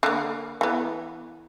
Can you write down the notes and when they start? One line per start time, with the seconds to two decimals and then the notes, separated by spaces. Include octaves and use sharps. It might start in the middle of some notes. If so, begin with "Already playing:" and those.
0.03 D3 A#3
0.61 E3 B3